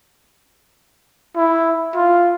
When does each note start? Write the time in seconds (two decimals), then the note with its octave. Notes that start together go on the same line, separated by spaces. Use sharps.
1.36 E4
1.95 F4